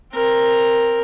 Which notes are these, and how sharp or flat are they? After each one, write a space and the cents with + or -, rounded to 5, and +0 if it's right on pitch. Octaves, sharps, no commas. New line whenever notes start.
C4 +15 A#4 +0